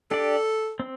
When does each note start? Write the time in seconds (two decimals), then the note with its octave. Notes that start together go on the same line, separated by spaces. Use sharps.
0.11 D4 G4 A4 D5
0.80 C4